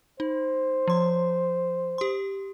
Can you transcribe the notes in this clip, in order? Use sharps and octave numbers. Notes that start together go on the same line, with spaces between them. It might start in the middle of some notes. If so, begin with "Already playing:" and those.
D#4 C5
F3 C6
G4 C6